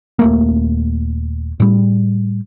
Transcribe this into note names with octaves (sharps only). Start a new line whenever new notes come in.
D#1 A3 A#3
A2 G3